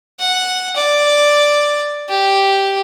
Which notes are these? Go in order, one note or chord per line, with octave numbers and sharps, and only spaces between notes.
F#5
D5
G4